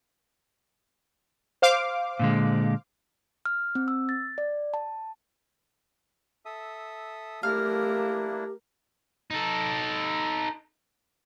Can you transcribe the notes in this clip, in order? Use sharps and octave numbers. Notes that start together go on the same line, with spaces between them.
C5 F5 D6
A#2 D3 G#3
F6
C4
E6
A6
D5
A5
A4 E5 D#6
A3 A#3 D4 E4 G4 A#4 F5
D#4 A4